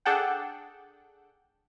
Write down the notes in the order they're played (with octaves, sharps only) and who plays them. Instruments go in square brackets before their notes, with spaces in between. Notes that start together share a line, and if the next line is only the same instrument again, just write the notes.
[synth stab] D4 G#4 A4 F#5 G5